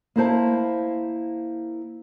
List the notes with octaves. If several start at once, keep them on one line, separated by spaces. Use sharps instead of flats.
A#3 E4 C5 A5